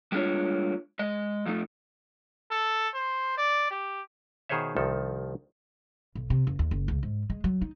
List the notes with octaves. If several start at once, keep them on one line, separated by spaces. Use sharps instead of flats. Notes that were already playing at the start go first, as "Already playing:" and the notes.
G3 G#3 A#3 D4 F4 C#5
G#3 D#5
F2 F3 A3 D#4
A4
C5
D5
G4
B2 D#3 G#4 C5 C#5 E5
C2 D#3 F3 A4
B1
C3
F#1
D#2
F#1
C#2
G#2
G#3
F#3
D#4